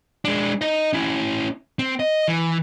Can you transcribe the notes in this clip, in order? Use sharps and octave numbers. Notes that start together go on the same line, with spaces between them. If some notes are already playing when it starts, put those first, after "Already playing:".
G#3 D4
D#4 D#5
C#4 E4
C4
D#5
E3